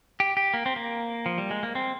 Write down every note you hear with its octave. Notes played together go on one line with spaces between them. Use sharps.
G4
G4
A#3
C4
A#3
F3
G3
G#3
A#3
C4